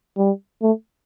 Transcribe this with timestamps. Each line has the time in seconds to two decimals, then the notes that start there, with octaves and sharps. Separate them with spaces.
0.17 G3
0.63 A3